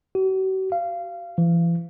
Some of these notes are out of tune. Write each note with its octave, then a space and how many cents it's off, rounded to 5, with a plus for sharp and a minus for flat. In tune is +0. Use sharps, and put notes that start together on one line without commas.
F#4 +45
F5 -20
E3 +40